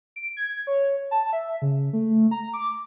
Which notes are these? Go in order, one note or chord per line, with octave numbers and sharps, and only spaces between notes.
D7
G#6
C#5
A5
E5
C#3
A3
A#5
D6